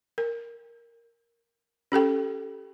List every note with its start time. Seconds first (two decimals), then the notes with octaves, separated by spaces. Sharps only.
0.18 A#4
1.92 C#4 G4 A4 G5